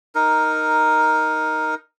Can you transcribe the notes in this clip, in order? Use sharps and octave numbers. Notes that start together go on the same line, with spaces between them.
D#4 A#4